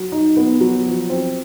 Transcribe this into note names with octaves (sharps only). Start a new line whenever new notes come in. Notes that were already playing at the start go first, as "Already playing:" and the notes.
Already playing: F#3
D#4
B3
F#3
F3
C4